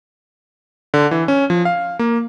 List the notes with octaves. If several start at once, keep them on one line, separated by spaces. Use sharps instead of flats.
D3
E3
C#4
F3
F5
A#3